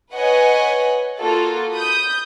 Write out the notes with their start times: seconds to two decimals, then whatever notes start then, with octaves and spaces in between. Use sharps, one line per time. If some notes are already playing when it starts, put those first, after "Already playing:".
0.13 B4 C#5 D#5 F#5 G#5
1.19 A#3 F4 F#4 A4
1.73 B5 D#6 G6